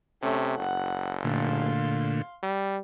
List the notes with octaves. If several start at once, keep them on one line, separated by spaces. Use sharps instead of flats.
C3 A3 C#4
F#1 F#5
A#2 D3 A3 F5 C6
G3